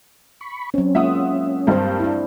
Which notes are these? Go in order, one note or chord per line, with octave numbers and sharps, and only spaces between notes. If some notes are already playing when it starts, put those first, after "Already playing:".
B5 C#6
F#3 C4 C#4
G#3 A#3 F4 E5 F#5 D#6
G2 G3 A#3 C4 C5
D4 E4